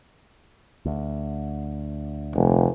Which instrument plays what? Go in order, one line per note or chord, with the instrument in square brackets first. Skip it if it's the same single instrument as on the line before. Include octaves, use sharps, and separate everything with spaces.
[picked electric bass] D2
[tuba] F1